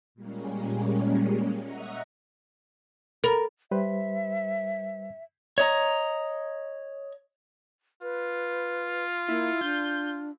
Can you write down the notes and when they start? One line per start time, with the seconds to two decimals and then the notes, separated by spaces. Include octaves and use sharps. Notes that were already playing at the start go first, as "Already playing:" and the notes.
0.15 A#2 G3 G#3 A#3 C#4
1.61 D#5 E5 F#5 A#5 C#6 D#6
3.24 A4 A#4 B5
3.71 G3 B4 C5 E5
5.58 C#5 D#5 A#5
8.02 F4 B4
9.29 A#3 E4
9.61 D4 G6